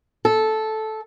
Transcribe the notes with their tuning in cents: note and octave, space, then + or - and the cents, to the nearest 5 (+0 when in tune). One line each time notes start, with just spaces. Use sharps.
A4 -10